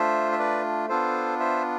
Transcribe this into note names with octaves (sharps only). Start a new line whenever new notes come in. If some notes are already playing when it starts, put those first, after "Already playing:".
Already playing: A3 D4 F4 C5 E5
E5
B4 D5
B3 D4 F4 A4 C5
C5 E5